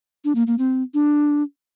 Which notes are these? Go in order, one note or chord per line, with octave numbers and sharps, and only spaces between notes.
D4
A#3
A#3
C4
D4